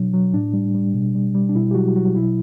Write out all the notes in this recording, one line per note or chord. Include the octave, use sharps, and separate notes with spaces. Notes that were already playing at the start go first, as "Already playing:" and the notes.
Already playing: B2 F#3 D4
F#3
A2 D4
G3
G3
B2
G3
G3
D4
B2 E4
G4
F#3 F#4
F#3 F#4
B2 E4